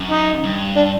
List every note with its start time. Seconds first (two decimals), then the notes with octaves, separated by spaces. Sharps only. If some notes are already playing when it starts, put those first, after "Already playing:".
Already playing: F#2
0.11 D#4
0.44 G2
0.76 D4